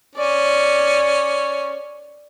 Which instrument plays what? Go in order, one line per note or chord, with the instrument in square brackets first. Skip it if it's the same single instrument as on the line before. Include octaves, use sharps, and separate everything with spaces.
[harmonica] C#4 [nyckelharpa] D5